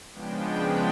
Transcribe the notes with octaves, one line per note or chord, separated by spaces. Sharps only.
C#3 F3 G#3 B3 D4 G5